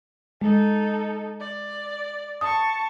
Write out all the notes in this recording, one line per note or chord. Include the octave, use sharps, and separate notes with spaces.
G#3 D#4 A4
D5
A5 C#6 D#6